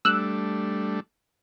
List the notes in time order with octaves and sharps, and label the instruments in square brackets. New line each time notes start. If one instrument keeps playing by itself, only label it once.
[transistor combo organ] G3 A3 D4 [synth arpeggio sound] E6 F#6